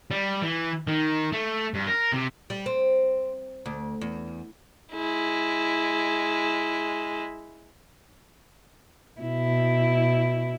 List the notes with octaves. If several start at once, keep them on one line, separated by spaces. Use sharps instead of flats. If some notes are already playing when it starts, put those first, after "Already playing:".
G3
E3
D#3
A3
G2
A#4
C3
G3
C4
D2
E2
G#3 E4
B2 E4